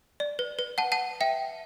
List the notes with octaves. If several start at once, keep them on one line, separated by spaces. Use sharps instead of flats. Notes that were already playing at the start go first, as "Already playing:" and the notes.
D5
B4
B4
F#5 A5
F#5 A5
E5 G5